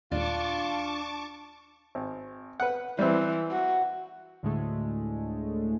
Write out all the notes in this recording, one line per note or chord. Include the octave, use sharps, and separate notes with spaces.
D#2 A#2 G#3 D4 F4 A5 C#6 D6
G#1
B4 F#5
E3 G3 C4
F#4
D2 A2 D3 G#3 A3